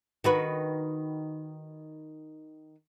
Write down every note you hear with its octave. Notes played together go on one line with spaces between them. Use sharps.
D#3 F#4 B4